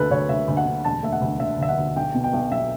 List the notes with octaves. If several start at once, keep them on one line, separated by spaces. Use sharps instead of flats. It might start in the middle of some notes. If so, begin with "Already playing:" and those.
Already playing: D2 F#3 A4 B4
D2 C#5
D2 E5
D2
F#5
D3
E1 A5
A3 E5
F#5
D2
D3 E5
D2 E5
F#5
D2
B1 G5
B2
G5
B1
B1 E5